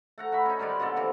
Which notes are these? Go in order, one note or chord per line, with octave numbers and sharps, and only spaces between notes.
A3 F#5 A#5
F#4 E5 B5
C#4 D#4
D#3 G3 G#3 D5
B2 D3 A#3 A4
C3 E3 F3